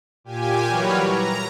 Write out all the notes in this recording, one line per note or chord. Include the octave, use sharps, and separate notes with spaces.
A#2 G4 G#5
E3 F#3 G3 A#4 B4 C#5
A#5